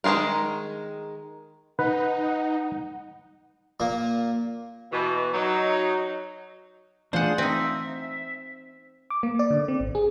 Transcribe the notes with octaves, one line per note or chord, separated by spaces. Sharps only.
D#3 G#3 F4 G#4 A#4
D#4 B4 F#5
A#2 A#3
B2 E3
F#3 D#4
E3 A3 D4 F4 G#4 C5 F#5
C4 D#4 E5
D6
A#3
D5
D3
C4
G#1
G#4